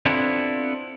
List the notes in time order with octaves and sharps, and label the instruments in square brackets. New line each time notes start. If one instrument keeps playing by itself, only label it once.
[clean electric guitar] B3 C4 D4 E4 F4 A4